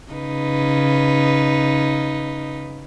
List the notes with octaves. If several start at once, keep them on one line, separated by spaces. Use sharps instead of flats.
C#3 D#4 B4